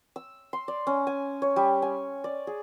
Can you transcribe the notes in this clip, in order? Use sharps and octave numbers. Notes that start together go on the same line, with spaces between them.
E6
C6
D5
C#4
G#5
C#5
G3
G#5
D5
G#4